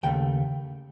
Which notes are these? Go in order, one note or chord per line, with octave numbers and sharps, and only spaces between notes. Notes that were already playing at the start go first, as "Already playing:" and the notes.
D#2 C#3 A3 G5